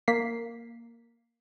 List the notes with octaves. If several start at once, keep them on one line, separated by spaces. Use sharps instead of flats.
A#3 B6 C7